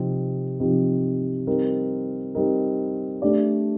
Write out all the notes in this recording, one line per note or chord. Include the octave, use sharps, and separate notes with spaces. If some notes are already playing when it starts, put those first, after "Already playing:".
Already playing: C3 F3 C4 D#4 G4
C3 F3 C4 D#4 G4
G3 C4 D#4 A#4
G3 C4 D#4 A#4
A3 D4 G4 D5